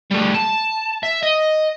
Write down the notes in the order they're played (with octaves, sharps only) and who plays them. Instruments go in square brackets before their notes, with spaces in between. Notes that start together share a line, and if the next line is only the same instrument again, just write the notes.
[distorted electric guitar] G3 A3
A5
E5
D#5